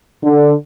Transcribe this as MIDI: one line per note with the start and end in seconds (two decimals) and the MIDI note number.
0.23 0.53 50